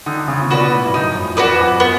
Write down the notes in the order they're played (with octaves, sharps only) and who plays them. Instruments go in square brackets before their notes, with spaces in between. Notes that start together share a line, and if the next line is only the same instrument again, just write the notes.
[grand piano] D3 [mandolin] D#4
[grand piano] C#3
A#2
[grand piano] B2 [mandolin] F#4 B4 D5
[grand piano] A2
G2
[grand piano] F#2 [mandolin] D#4
[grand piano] F2
[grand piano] F2 [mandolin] F#4 B4 D5
[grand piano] F2
F#2
[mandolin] B3